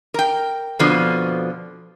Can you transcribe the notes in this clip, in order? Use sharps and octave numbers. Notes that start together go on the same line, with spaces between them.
A#4 G5
F2 B2 D3 F3